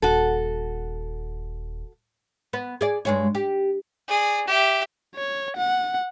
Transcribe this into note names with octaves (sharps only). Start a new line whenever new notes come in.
D#1 F#4 A4
B3
G#4 D5
G2 G#3 C#5
G4
G#4 D5
G4 E5
C#5
F#5